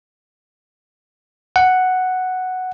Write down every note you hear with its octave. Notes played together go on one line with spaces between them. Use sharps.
F#5